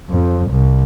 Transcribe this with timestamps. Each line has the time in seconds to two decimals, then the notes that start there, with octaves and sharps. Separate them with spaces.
0.10 F2
0.50 C2